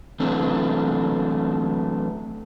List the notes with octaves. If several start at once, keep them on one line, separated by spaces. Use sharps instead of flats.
D3 E3 F#3 A3 C4 D4